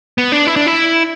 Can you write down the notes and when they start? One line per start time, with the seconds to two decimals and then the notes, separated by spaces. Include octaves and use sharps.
0.18 B3
0.32 D4
0.47 E4
0.56 D4
0.67 E4